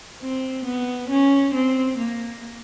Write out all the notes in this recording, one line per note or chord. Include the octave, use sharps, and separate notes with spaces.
C4
B3
C#4
C4
A#3